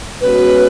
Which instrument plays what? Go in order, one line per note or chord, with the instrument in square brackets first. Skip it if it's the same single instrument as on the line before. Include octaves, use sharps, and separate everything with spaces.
[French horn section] B2 G#3 C#4 F#4 [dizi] B4